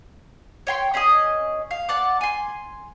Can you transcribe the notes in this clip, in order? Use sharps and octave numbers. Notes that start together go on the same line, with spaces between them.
C#5 G5 C6
C#4 G#4 A4 D#5
F5
D5 F#5 A5 D6
G#5 C6